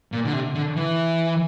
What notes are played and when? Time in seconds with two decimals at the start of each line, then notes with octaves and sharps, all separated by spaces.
0.12 A#2
0.26 D3
0.33 C3
0.55 D3
0.76 E3